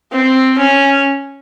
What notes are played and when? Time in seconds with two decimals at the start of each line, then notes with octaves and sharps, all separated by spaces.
0.12 C4
0.58 C#4